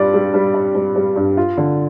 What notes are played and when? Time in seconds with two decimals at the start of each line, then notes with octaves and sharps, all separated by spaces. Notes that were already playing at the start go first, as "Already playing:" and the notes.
Already playing: G2 G3 F4 D5
0.14 G3
0.34 G3
0.54 D5
0.75 G3
0.96 G3
1.16 G2
1.37 F4
1.57 D3